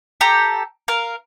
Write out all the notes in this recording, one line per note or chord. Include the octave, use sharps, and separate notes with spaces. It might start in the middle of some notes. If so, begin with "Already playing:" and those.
G4 A4 A#5
A#4 F5